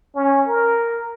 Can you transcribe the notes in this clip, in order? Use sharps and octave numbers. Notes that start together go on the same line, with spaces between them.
C#4
A#4